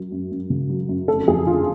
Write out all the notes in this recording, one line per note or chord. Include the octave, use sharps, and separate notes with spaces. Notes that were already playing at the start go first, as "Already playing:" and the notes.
Already playing: F#2 F#3
F#2
F#2
C#3
F#3
F#2
F1 A4
F2 G#4
D3 F4